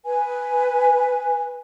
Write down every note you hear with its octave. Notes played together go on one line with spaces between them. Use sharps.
B4 G#5